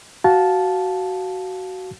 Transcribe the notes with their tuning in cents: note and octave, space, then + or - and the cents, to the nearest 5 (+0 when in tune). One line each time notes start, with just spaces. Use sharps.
F#4 +15 F5 +10 A5 -15